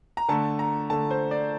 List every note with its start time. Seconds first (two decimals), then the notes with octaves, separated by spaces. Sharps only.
0.17 A#5
0.28 D3 A3 A5
0.59 A#5
0.90 D3 A3 A5
1.11 C5
1.31 D5